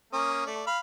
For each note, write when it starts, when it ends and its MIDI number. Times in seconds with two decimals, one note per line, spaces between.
0.13 0.45 58
0.13 0.45 61
0.13 0.45 87
0.46 0.63 57
0.46 0.63 74
0.67 0.79 77
0.67 0.79 83